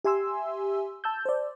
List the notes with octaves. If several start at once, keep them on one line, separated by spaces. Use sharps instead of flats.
G4 E5 G#5 C6 E6
A5 E6 G6
C5 D5